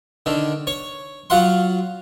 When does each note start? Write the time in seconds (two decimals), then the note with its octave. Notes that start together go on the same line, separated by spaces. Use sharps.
0.26 D3 D#3
0.67 C#5
1.30 F#3 F4 F5 F#5 C6